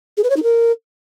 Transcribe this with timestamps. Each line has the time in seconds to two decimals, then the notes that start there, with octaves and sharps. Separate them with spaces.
0.17 G#4
0.24 B4
0.30 C#5
0.36 D#4
0.43 A#4